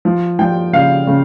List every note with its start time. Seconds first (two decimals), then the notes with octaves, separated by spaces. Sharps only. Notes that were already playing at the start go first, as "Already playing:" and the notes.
0.05 F3
0.39 F3 G5
0.73 C#3 F5
1.07 C#3